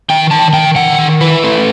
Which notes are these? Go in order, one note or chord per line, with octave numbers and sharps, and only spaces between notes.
D#3 G5
D#3 A5
D#3 G5
D#3 F#5
D#3
E4 B4
A3